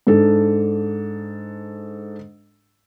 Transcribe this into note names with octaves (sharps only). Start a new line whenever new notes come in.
G#2 D4 A4